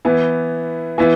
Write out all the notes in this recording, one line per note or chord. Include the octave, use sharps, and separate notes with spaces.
E3 B3 E4
E3 B3 E4